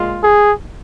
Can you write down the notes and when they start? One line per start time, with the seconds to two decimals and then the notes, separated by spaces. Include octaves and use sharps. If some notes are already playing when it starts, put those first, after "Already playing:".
Already playing: A#2 G#3 F4
0.23 G#4